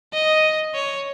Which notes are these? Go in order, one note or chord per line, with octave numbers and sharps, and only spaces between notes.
D#5
C#5